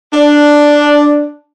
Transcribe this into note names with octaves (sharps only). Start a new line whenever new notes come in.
D4